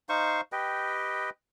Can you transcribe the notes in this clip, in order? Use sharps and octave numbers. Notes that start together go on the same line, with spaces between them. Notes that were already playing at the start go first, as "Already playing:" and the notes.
D#4 C5 F5 C#6
G4 B4 D#5 G5